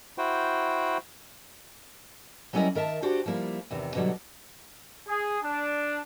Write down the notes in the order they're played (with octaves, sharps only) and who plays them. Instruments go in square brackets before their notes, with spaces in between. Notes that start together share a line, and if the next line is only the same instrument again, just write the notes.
[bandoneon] E4 F#4 C5 G5
[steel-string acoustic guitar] F#3 G3 C#4 E4 A#4 D#5
D#3 A#4 E5 A5
D4 F#4 G4 C5
F3 G3 A#3 E4
E2 C3 D#3
B2 D3 F#3 G3
[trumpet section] G#4
D4